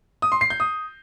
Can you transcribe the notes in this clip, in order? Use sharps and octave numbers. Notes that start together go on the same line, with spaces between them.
D#6
C6
C7
G6
D#6